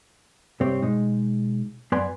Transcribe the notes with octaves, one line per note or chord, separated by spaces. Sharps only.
C2 G2 C3 C4 G4 C#5
B2 G#3 D#4
F#2 B3 B4 D5 G#5 C6